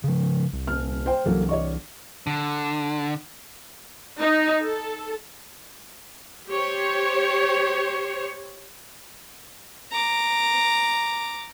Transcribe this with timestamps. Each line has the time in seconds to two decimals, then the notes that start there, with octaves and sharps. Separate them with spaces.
0.04 C#3 F3
0.53 C2
0.67 D#1 F6
1.06 C5 G5
1.26 C2 E3 F#3 A#3 A4
1.49 C#5 D5 C#6
2.27 D3
4.20 D#4
4.64 A4
6.48 G4 C5 C#5
9.91 A#5 D6